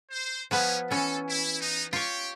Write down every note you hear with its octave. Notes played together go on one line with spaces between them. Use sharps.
C5
F3 G3 B3 C#4 B4
E3 C#4 A4
E4
B3 D#4
F4 G4 C#5